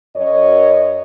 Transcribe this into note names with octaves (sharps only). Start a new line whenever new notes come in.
F#2 C#5 D#5